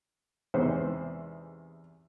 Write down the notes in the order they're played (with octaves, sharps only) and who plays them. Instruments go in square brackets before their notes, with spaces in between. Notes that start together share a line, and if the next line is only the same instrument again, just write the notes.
[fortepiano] E2 G#2 C3 E3 B4 C5